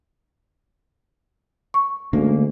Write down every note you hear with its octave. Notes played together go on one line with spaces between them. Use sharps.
C#6
D2 D3 G#3 A#3 C#4